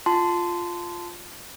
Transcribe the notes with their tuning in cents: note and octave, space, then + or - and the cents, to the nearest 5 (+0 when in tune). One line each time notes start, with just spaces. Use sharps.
F4 +0 A5 +0 C6 -20